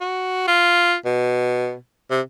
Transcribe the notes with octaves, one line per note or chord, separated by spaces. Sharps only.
F#4
F4
B2
C3